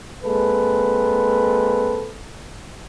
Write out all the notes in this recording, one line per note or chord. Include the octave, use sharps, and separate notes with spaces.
G#3 A#3 C4 A4 B4